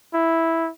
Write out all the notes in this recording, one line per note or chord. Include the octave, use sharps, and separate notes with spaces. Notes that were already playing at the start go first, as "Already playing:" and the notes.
E4